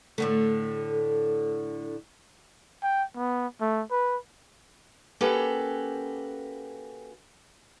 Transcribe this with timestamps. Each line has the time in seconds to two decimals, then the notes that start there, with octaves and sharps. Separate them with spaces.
0.18 A2 D3 A3
2.83 G5
3.16 B3
3.61 A3
3.91 B4
5.21 A#3 C#4 F#4 G4 A4 B4